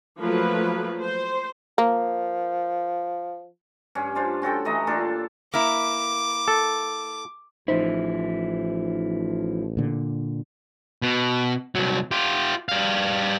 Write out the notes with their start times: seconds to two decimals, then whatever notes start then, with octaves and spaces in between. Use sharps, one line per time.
0.19 F3 F#3 A3 A#3 B4
1.00 C5
1.78 F3 A#3
3.95 G2 C#4
4.15 D4 F4 C5
4.42 C#4 F#4 A4 G5
4.65 E3 A3 D#5 A#5
4.87 A#2 D4 F4 A4
5.54 A#3 E4 D6
6.48 A4
7.68 A1 F3 D#4 E4 C5
9.77 A#2 D3
11.02 B2
11.75 C2 F#3
12.11 F4 G4
12.69 G3 F5